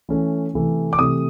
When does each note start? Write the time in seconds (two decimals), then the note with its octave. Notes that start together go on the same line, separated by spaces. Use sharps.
0.09 E3 A3 C#4
0.53 C3 E3 A3
0.93 D6
0.99 C3 E3 A3 D#6